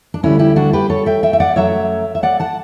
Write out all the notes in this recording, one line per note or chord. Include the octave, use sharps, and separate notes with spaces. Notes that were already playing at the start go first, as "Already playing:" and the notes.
D4
D2 D3 G3 C#4 E4
E4 G4
D4 F#4
G4 B4
A4 C#5
E5 G5
E5 G5
E5
D5 F#5
F#2 C#3 F#3 A3 C#5 E5
E5
D5 F#5
F#5 A5